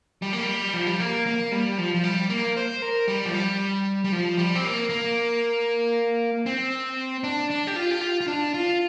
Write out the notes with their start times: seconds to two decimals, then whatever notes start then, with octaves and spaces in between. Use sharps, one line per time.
0.22 G3
0.33 A#3
0.43 G3
0.74 F3
0.87 G3
1.00 A#3
1.27 A#3
1.52 G3
1.78 F3
1.94 F3
2.04 G3
2.29 A#3
2.57 C5
2.82 A#4
3.08 G3
3.26 F3
3.34 G3
4.04 G3
4.12 F3
4.37 G3
4.55 C4
4.64 A#3
4.89 A#3
6.46 C4
7.24 D4
7.50 D4
7.67 G4
7.76 F4
7.90 G4
8.01 F4
8.21 F4
8.28 D4
8.54 F4